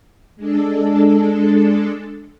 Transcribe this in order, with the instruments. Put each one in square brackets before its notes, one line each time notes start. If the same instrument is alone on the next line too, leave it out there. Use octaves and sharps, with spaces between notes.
[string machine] G#3 D4 A4